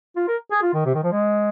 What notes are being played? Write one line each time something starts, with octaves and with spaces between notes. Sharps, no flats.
F4
A#4
G#4
F4
D#3
C3
D#3
F3
G#3